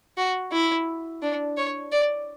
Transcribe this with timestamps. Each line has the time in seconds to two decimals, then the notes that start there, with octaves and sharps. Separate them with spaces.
0.17 F#4
0.52 E4
1.22 D4
1.57 C#5
1.92 D5